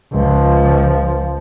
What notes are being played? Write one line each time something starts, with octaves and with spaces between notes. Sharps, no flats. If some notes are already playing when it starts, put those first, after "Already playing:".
C#2 F3